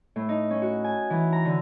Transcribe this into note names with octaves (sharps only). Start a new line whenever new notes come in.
A2
D#4
C#4
F#4
G#5
E3
A#5
D3